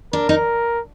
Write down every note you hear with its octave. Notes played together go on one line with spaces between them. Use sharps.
D4 A#4
D#4